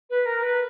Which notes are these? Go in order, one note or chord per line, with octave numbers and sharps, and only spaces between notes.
B4
A#4
B4